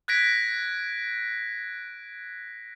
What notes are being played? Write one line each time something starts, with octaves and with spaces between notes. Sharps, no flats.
F#6 G#6 A#6 B6 D7